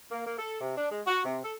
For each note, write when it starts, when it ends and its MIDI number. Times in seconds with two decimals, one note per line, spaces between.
0.11 0.26 58
0.27 0.38 58
0.39 0.59 69
0.61 0.76 48
0.77 0.91 62
0.91 1.02 56
1.07 1.22 66
1.25 1.39 48
1.44 1.54 69